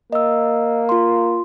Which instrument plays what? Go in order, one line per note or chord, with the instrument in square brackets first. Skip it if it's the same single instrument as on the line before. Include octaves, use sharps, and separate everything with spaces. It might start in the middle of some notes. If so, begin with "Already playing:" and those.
[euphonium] A#3 [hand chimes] D#5 E6
[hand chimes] F4 C6